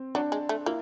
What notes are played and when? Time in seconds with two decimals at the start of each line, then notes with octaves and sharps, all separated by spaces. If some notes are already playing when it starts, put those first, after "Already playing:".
Already playing: C4
0.15 F#3 D4
0.32 G#3
0.49 A3
0.66 A#3 E4